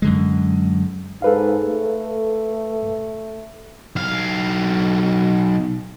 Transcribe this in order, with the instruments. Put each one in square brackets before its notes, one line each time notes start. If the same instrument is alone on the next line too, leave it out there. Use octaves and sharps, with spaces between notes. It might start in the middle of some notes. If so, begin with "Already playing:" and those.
[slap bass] F#2 D3 G#3
[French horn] G#2 [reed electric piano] A4 B4 F5
[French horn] A3
[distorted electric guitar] B1 F5